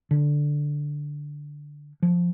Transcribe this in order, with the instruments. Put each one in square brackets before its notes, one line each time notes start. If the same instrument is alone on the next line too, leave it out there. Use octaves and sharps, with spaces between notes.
[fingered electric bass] D3
F3